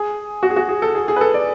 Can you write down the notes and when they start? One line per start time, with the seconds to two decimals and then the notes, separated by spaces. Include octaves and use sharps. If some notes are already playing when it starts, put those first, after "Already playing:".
Already playing: G#4
0.43 F#4
0.50 G#4
0.56 F#4
0.69 G#4
0.82 A4
0.95 G#4
1.08 G#4
1.16 B4
1.21 A4
1.34 D5